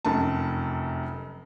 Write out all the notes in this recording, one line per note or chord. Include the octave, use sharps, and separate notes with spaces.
F1 F#2 A5